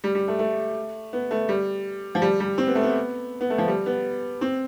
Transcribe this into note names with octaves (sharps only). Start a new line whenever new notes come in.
G3
G3
A3
A3
B3
A3
G3
F3
G3
G3
C4
B3
A3
B3
B3
A3
F3
G3
B3
C4